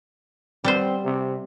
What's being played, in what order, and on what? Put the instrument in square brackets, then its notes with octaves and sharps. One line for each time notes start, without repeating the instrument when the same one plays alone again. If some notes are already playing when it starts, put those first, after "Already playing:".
[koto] G3 B3 C5 [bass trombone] C4
[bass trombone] C3